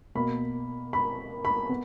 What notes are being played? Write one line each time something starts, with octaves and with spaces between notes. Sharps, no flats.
B2 A#3 B5
B5
B5
B3